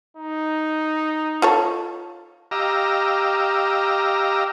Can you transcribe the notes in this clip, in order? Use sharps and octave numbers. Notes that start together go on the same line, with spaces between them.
D#4
F4 A4 C#5
G4 D#5 F5 A#5 D6 E6